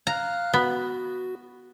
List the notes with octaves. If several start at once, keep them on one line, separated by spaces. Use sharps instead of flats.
F5 A#5 F6 F#6
B3 F#4